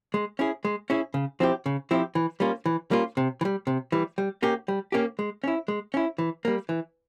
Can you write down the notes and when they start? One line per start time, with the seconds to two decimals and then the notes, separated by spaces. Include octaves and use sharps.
0.14 G#3
0.39 C#4 E4 G#4
0.65 G#3
0.90 C#4 E4 G#4
1.14 C#3
1.40 F3 C4 E4 G4
1.66 C#3
1.91 F3 C4 E4 G4
2.15 E3
2.40 G3 A#3 C#4 F4
2.66 E3
2.91 G3 A#3 C#4 F4
3.17 C3
3.41 E3
3.45 G3
3.67 C3
3.92 E3 G3
4.18 G3
4.42 A#3 C#4 G4
4.68 G3
4.92 A#3 C#4 G4
5.19 G#3
5.44 C#4 E4
5.68 G#3
5.94 C#4 E4
6.18 E3
6.45 G3 A#3
6.69 E3